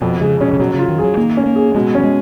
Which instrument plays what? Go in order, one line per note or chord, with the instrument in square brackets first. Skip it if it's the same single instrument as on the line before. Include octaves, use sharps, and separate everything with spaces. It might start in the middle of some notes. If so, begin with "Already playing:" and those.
[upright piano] F2 [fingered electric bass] B2
[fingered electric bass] C#3 [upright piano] G#3
[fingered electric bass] B2 [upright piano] C#4
[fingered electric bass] C#3
[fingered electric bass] B2 [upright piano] F#3
[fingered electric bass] C#3 [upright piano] F4
[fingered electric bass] D#3
[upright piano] G#4
[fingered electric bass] F#3
[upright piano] D#3 [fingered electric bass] A#3
[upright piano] C#4
[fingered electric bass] A#3
[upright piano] G#4
[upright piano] B2 [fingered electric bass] G#3
[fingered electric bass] F#3 [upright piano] C#4
[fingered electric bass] G#3